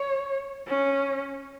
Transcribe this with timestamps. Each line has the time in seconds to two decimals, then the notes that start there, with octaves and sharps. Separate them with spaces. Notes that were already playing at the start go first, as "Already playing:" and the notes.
Already playing: C#5
0.67 C#4